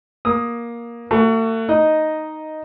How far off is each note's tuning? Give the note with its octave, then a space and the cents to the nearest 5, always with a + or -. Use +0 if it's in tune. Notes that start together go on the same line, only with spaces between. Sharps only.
A#3 +15 D#6 +0
A3 +40 F#4 +10
D#4 +0 D#5 +0